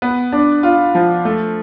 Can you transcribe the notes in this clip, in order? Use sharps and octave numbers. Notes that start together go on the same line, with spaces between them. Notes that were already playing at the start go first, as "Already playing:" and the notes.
B3
D4
F4
F3
A3